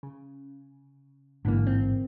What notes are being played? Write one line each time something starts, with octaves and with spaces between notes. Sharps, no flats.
C#3
A1 G#2 D3 E3 A#3
C4